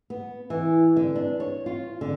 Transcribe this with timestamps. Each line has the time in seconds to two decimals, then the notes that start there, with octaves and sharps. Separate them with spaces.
0.10 B3
0.50 E3
0.96 D3
1.16 D4
1.40 C#5
1.66 F4
2.01 D3